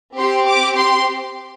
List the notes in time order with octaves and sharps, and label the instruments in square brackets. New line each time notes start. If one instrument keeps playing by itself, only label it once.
[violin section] C4 G4 C6
D6
C6